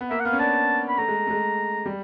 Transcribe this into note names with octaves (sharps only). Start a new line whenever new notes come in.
B3
A#3 E5
F#5
B3 F5
C#4
D4 A5
B5
A3 A#5
G#3
A3
G#3
G3